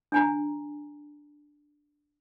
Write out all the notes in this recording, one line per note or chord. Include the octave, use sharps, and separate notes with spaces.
D4 G#5 A#5